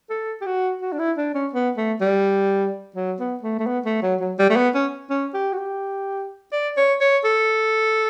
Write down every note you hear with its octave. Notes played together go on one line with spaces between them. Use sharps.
A4
G4
F#4
F#4
D4
E4
D4
C#4
B3
A3
G3
F#3
B3
A3
A3
B3
A3
F#3
F#3
G3
A3
B3
C#4
C#4
G4
F#4
G4
D5
C#5
C#5
A4